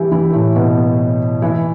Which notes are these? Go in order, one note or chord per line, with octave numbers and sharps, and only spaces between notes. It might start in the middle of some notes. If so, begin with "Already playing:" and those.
Already playing: E3 G3 E4 G4
E3 E4
A2 A3
B2 B3
E3 E4